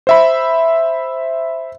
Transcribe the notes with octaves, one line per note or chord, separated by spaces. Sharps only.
C5 E5 B5